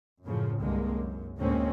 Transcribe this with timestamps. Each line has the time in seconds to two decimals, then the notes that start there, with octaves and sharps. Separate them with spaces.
0.25 F#2 A2 C#3 F3
0.60 C2 G2 D3 G#3 A#3
0.94 F#2
1.38 D2 A2 G#3 A#3 C4 C#4